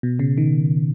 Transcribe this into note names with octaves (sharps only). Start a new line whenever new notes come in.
B2
C#3
D#3